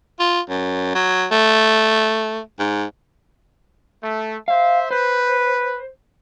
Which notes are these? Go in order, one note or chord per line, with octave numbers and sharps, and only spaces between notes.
F4
F#2
F#3
A3
G#2
A3
C5 E5 F5
B4 C5